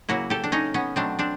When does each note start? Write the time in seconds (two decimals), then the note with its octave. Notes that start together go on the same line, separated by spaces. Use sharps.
0.09 C#3 F#3 A#3 E4 F#4
0.30 G4 A4
0.44 D4
0.52 C#4 D#4
0.74 B3 C#4
0.96 B2 F#3 A3 C4 D4
1.19 C4 D4